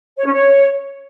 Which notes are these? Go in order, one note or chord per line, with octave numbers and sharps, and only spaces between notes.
C#5
C#4
C#5